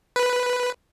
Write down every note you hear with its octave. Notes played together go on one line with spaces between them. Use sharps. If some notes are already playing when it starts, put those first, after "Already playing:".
B4